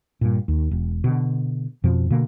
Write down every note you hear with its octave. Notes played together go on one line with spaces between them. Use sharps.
G2 A#2
D#2
E1
B2 D3
F2 B2 F3
B2 D3 A#3